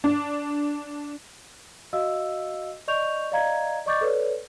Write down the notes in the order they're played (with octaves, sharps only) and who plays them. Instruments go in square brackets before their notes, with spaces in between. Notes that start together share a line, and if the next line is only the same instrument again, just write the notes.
[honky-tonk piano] D4
[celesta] F#4 D#5 F5 E6
D5 D#5 C#6 G6 F7
D5 D#5 F5 A#5 G#6
D5 D#5 C#6 D6 G6 A6
A4 B4 C#5 D5